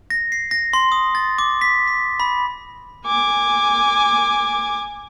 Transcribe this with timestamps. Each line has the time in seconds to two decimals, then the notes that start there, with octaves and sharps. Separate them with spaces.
0.10 A#6
0.32 C7
0.51 A#6
0.73 C6
0.92 D#6
1.15 A6
1.38 D6
1.61 B6
1.88 B6
2.20 B5
3.06 G#5 D6